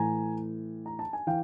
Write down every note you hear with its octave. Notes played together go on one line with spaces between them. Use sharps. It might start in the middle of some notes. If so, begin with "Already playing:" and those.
Already playing: A2 E3 G#5 A#5
A#5
A5
G#5
E3 F5 G5